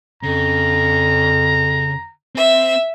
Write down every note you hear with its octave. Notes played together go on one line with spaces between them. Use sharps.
F2 C#3 A#5
C4 E5